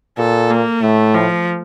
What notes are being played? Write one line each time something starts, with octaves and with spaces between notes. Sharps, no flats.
A#2 A4
A#3
A2 A3
F3